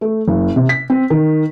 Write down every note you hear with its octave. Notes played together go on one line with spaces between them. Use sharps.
A3
F#1
C3
B6
C4
D#3